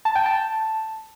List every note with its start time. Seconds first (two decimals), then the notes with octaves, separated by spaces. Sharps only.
0.05 A5
0.15 G5
0.26 A5